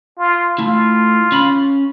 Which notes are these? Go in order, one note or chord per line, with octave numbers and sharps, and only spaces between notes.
F4
A3 E4 F4
C#4 B5